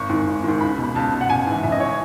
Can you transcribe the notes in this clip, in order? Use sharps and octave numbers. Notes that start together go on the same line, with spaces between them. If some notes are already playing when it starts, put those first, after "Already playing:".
Already playing: G#1 C#6
G#2 D#3
G#1
G#2 D#3
C#2 B5
B2
B5
C#2 A5
B2
F#5
A1 G#5
G#2 E3
A1 E5
D#5
C#5
E3